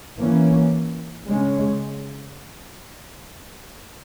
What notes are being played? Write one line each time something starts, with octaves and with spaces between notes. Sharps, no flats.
E3 A#3 C#4
C#3 G#3 C#4